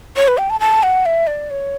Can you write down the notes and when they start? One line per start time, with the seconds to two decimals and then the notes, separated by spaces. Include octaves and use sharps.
0.17 C#5
0.28 B4
0.38 G5
0.50 A5
0.60 A5
0.83 F#5
1.06 E5
1.27 D5
1.50 C#5